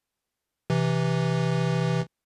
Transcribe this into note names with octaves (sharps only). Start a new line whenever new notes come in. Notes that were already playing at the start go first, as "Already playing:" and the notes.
C3 E3